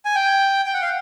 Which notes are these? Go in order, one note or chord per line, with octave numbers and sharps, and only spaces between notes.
G#5
G5
G5
F#5
F5